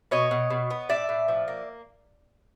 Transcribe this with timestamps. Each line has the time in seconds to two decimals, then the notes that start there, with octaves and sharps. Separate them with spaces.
0.11 B2 C#5 D#5
0.31 B2
0.50 B2
0.70 B3
0.89 A2 D5 E5
1.09 A2
1.28 F3
1.48 A#3